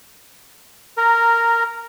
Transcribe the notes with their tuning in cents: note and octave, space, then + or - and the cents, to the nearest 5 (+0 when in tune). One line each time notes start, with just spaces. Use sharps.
A#4 -10 A#5 +0